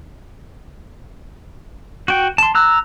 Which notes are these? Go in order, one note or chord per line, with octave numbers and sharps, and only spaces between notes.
F#4 G5
A5 C6
A#5 E6 F#6